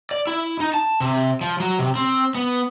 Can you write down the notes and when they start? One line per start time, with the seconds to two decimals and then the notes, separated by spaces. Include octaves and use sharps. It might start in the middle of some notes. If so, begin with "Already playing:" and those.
0.11 D5
0.27 E4
0.60 D#4
0.74 A5
1.00 C3
1.41 F3
1.60 F#3
1.79 C3
1.96 C4
2.35 B3